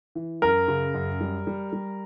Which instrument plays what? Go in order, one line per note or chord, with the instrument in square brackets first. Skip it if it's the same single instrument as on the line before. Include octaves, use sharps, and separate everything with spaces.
[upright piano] E3
[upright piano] F#2 [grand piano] A#4
[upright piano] C#3
F#2
G3
G3
G3